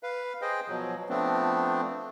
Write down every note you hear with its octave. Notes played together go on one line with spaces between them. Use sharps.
B4 F5
G#4 C5 D#5 G5
B2 F3 F#3
F3 A3 B3 C4 D4